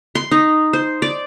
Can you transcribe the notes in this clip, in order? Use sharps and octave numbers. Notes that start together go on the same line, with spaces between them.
C6
D#4
C5
D5